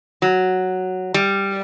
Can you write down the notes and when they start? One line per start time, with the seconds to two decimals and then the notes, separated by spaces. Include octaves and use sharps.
0.22 F#3
1.14 G3